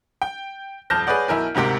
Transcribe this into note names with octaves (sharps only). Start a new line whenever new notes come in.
G5
D#1 F2 A5 F6 G6 A#6
G#4 B4 C#5 D5 F#5
B1 E4 A#4 G#5
D2 G#2 C3 G4 A#4